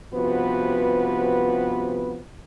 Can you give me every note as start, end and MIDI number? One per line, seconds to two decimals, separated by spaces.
0.13 2.21 43
0.13 2.21 48
0.13 2.21 53
0.13 2.21 59
0.13 2.21 66
0.13 2.21 71